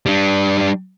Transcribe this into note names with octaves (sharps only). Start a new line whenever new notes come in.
G3 D4